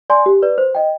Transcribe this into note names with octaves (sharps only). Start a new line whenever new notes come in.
D5 G#5 C6
G4
B4 D5
C5
D#5 G5